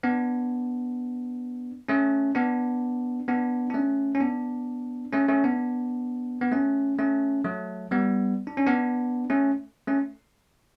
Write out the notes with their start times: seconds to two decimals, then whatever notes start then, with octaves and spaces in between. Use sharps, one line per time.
0.03 B3 D4
1.88 A3 C#4
2.35 B3 D4
3.28 B3 D4
3.70 D4
3.74 A3 C#4
4.15 C#4
4.20 B3 D4
5.13 A3 C#4
5.28 A3 C#4
5.44 B3 D4
6.41 B3
6.51 A3 C#4
6.98 A3 C#4
7.45 F#3 A3
7.91 G3 B3
8.47 D4
8.57 C#4
8.67 B3 D4
9.30 A3 C#4
9.87 A3 C#4